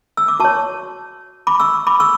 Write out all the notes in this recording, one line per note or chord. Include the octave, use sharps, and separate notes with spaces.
E6
D6
F#4 C#5 A5 C#6
B5 D6
C#6 E6
B5 D6
C#6 E6